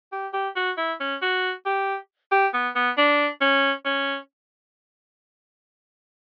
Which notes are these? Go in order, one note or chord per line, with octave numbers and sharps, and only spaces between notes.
G4
G4
F#4
E4
C#4
F#4
G4
G4
B3
B3
D4
C#4
C#4